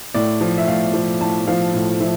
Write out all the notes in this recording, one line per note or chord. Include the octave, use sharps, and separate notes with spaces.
A2 D5
F3
E5
A2 F5
F3
A2 A5
F3 F5
A2
F3 E5